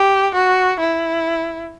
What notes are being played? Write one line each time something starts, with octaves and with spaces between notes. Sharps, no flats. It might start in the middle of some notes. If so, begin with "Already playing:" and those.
Already playing: G4
F#4
E4